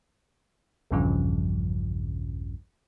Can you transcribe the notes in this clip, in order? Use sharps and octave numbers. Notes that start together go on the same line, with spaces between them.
A#1 E2 G2 C#3 F3